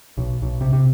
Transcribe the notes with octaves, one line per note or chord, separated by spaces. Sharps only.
B1
B1
C3
C3